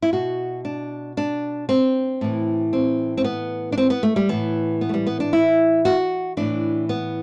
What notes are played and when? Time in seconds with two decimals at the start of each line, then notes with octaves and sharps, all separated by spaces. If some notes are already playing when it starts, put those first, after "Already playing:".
0.02 E4
0.13 B2 F#4
0.65 D4
1.17 D4
1.69 C4
2.21 A2 E3
2.73 C4
3.17 C4
3.24 B3
3.72 D4
3.78 C4
3.90 B3
4.03 A3
4.16 G3
4.29 A2 E3 B3
4.81 B3
4.89 A3
4.94 G3
5.07 B3
5.20 D4
5.33 E4
5.85 F#4
6.37 A2 E3 D4
6.89 B3